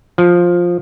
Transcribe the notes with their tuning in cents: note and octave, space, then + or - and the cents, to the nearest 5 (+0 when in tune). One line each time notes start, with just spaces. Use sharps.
F3 +5